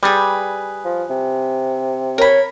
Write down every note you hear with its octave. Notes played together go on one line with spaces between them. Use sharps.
G3 G#4 B4
F3
C3
A#4 C#5 B5